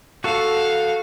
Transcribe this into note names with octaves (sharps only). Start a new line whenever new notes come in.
F#4 A4 F5